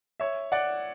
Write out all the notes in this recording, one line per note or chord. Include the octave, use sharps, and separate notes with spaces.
C#5 E5
D5 F#5